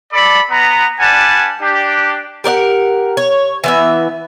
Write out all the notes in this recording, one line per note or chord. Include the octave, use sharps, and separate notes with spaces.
A4 D5 B5
B3 A#5
G3 D4 B4 F#5 G#5 A5
D4 G4
G4 A#4 D5 F#5
C#5
E3 B3 E5